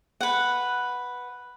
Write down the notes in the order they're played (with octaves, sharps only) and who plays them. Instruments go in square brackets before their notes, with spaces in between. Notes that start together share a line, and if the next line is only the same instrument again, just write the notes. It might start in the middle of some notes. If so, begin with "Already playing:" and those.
[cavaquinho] B4 F#5